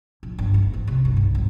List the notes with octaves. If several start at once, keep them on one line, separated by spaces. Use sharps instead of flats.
A#1
G1
G#2
E3
C3
G2
B1
G1